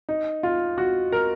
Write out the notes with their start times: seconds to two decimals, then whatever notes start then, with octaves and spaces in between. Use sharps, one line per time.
0.09 D#4
0.43 F4
0.78 F#4
1.12 A#4